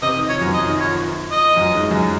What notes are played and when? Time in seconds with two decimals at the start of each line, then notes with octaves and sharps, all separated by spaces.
0.02 C3 C4 D#5
0.16 D#3
0.29 F3 C#5
0.41 F#2 F#3
0.54 F3 D#5
0.66 D#3
0.80 F3 C#5
0.93 F3
1.31 D#5
1.52 F3
1.56 F#2 F#3
1.73 G#2 G#3
1.91 F#2 F#3